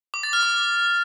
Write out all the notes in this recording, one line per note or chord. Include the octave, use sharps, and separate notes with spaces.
D6
A6
F6
D6